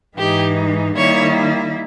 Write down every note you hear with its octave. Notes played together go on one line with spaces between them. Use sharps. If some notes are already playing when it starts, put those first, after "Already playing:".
G#2 E3 G#3 D#4 G4
D#3 G3 A#3 E4 C#5